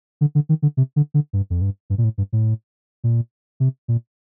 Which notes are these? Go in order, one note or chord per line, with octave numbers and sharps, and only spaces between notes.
D3
D3
D#3
D3
C3
D3
D3
G2
F2
G2
G2
A#2
A2
G2
A2
A#2
C3
A#2